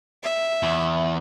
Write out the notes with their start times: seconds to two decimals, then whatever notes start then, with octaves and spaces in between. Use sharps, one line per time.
0.23 E5
0.63 E2